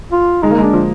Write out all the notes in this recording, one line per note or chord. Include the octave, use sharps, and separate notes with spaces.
F4
G#3 D#4
A#3
G#3
D4
F3